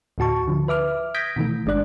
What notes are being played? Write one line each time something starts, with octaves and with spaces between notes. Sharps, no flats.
D2 A2 F#4 A5 C#6
D3 F3
B4 E5 D6 F6
D#6 G6 G#6 A#6 B6 D7
B2 D#3 E3 A3
G1 G#3 D4 D5 F#6